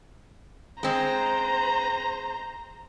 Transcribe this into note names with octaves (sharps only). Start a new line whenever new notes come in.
G#3 C4 C5 A#5